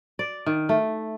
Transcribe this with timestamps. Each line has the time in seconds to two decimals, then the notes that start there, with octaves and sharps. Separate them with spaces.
0.19 D5
0.46 D#3
0.69 A3